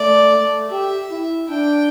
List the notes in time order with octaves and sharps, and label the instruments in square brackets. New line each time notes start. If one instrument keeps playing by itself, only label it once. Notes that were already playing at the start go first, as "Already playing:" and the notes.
Already playing: [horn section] A3 [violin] D5
[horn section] A3
[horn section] G4 [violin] E5
[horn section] E4
[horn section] D4 [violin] G5